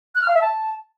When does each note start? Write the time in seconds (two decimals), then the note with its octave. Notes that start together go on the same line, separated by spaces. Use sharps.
0.15 F#6
0.22 F6
0.28 F5
0.35 E5
0.41 A5